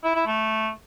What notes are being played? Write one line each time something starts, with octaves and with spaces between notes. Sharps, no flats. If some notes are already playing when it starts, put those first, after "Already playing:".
E4
E4
A3